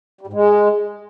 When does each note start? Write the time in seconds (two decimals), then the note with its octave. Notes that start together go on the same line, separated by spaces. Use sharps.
0.21 G3
0.27 G#2
0.33 G#3